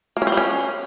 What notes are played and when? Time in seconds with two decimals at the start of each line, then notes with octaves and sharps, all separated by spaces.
0.17 A#3
0.22 C#4
0.27 C4
0.32 G3
0.37 C#4